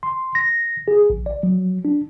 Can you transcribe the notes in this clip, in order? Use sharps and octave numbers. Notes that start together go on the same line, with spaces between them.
C6
A#6
G#4
A#1
D5
F#3
D4